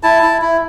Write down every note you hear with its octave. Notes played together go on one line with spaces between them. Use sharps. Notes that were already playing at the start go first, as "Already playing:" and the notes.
E4 A5
E4
E4